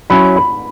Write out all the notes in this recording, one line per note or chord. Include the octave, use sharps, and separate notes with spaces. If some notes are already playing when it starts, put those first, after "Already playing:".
F#3 C#4 E4 B5
B5